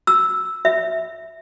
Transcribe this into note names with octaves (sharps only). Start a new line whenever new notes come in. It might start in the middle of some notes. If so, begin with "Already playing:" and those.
E6
E5